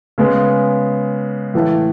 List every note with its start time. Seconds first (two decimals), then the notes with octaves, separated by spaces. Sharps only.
0.18 C#3 G#3 B3
1.54 A2 E3 A3